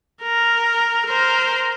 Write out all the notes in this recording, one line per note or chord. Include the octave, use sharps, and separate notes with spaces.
A#4
A#4 C5